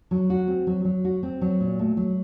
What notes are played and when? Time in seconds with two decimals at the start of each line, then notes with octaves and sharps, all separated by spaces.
0.11 F#3
0.30 F#4
0.48 C4
0.67 F#3
0.85 F#3
1.04 F#4
1.23 C4
1.41 F#3
1.60 A#2
1.79 A3
1.97 F#3